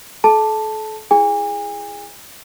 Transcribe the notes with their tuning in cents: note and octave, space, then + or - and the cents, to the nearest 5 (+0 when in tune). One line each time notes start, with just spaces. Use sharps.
A4 -35 A5 +0
E4 +30 G#4 +0 G#5 -40